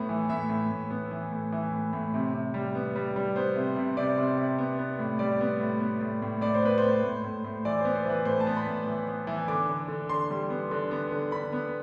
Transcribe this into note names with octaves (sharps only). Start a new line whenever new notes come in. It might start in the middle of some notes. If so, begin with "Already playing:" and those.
Already playing: A2 B3
E3
A2 E5
A2
A2
B3
E3
A2
E3
A2
A2
C3
C3
G3
B3
G3
G3
B3 C5
C3
C3
C3 D5
C3
C3
B3
B3
A2
G3 D5
B3
A2
B3
A2
A2
A2 D5
C5
B3 B4
A2 C5
A2
A2
A2
E3 D5
B3 C5
C5
E3 B4
A2 C5
A5
B3
B5
A2
E3
B3
E3
D3 D6
D3
D3
D3 C6
G3
B3
D3
B3
D3
D3 B5
B3